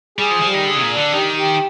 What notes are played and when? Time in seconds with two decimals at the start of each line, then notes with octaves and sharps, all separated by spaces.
0.18 G3 G#4
0.31 F3
0.41 F3 G3
0.54 D#3
0.65 D3 G#4
0.76 C3
0.82 A#2
0.89 D4
0.96 D3
1.12 D#3 G4
1.36 G4